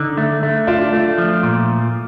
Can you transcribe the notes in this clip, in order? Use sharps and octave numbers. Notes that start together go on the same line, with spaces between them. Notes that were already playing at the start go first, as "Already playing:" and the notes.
Already playing: D3 D#4
A3
A3
D4 F4
A3
F3
A#2